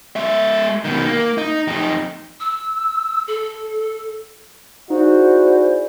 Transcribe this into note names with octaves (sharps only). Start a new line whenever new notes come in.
G#3 E5
B2 D#3
A#3
D#4
F2 D#4
E6
A4
D#4 E4 F#4 G#4 C5 D5